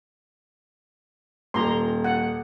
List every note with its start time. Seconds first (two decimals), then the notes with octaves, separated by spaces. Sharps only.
1.54 D#1 A#5 C6
2.04 F#5